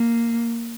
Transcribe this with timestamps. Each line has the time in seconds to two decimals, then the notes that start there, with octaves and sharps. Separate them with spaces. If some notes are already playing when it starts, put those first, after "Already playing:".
Already playing: A#3